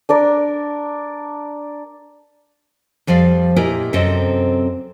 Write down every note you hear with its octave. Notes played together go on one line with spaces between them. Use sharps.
D4 A#4 D5
F2 F3 G3 D5 F5
A#2 E4 G4 A#4 D#5 G#5
F#2 C3 C4 A4 D#5